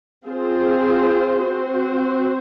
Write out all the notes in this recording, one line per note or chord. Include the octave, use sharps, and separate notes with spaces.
C4 F4 G#4 C5
C4 F#4 C5